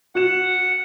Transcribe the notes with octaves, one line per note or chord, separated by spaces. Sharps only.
F#4 F#5 E7